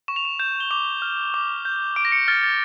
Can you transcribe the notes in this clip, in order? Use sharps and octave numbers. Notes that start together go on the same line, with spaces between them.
C#6 E7
F7
E7
G6 E7
G7
D6 F7
F6
D6
G6
D6 D7
A#6
C#7
F6 A6
A6